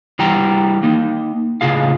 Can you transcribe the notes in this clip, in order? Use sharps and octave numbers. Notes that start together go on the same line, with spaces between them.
E3 G3 G5 A#5
A#3 D#4
A2 C#3 F4 G#4 F5